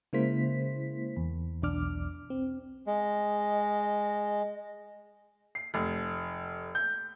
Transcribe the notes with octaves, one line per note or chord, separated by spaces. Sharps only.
C#3 G#3 A#3 E4 C5 B6
E2
B1 E2 D4 D6 F6
C4
G#3 D#5
C7
F1
G6